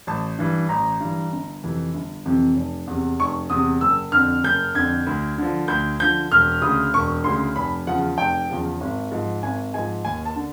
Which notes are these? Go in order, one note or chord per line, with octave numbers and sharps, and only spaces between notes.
A1 A5
G2 E3
A1 A#5
G2 E3
G1
F2 C3 E3
G1
F2 C3 E3
F1
E2 C3
F1 C#6
E2 C3 D#6
F#1 E6
F2 D3 F6
F#1 G6
F2 D3 G#6
D2
D3 F3
D2 G6
D3 F3 G6
E1 F6
D2 C#3 D#6
E1 C#6
D2 C#3 C6
F1 B5
E2 C#3 F3 F#5
F1 G5
E2 C#3 F3
G#1
G#2 F3
G#1 G#5
G#2 F3 G#5
D#2 G#5
A5
D3